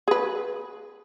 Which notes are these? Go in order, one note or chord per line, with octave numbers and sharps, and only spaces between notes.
G#4 B4